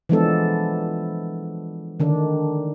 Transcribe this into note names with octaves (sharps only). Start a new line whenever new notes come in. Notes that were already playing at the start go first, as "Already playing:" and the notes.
E3 F3 G#3 B3 D4 A4
D3 D#3 D4